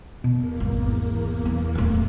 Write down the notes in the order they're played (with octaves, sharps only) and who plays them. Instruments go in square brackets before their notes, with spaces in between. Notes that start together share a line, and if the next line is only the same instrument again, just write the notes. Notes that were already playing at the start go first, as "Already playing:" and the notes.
[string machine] E2 A#3 [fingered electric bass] B2
[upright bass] G#1
E3
D1 A3